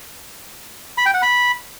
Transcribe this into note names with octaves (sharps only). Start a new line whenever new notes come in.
B5
G5
F#5
B5